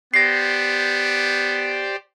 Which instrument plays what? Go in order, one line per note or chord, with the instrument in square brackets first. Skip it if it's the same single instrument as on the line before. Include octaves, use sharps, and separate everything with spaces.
[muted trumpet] B3 [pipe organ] G4 C5 D5 [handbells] A#6 C7